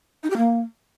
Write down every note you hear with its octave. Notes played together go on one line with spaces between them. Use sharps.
D#4
G4
A#3